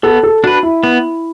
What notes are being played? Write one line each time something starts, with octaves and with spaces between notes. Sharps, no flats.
B3 A4
A4
D4 F#4 B4
E4
B3